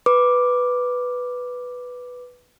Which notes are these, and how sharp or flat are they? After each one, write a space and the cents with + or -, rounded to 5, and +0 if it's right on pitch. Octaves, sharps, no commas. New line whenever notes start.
B4 +0 D6 +0